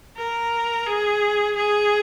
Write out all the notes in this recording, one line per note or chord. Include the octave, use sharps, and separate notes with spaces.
A#4
G#4
G#4